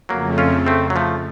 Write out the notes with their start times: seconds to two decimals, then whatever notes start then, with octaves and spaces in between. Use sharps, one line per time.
0.09 F2 C#3 F#3 A3 A#3
0.38 C#4 F4
0.67 A3 C4
0.90 F#3
0.96 F3 A3